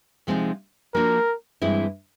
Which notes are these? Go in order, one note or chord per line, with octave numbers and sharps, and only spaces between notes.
C3 F3 G#3 C4 D#4
F3 A#3 D4 F#4 A#4
G2 E3 G#3 C4 E4